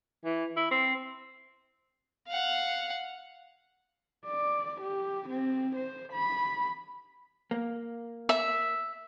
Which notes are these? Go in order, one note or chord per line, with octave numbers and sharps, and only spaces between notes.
E3
E4
C4
F5 F#5
D5
G4
C4
C5
B5
A#3
E5